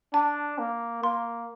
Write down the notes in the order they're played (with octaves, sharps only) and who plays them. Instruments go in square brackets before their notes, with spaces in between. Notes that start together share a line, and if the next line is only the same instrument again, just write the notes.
[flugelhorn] D4 [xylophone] A5
[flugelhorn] A#3
[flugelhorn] A#3 [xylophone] C6